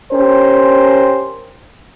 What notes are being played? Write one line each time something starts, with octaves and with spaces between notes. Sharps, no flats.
C#4 G4 A#4 C5